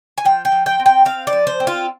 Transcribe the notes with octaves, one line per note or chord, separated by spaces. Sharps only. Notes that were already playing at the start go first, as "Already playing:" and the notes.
G#5
F3 G5
G5
F3
G5
C4
G5
C4 F5
D5
F3
C5
C4
F4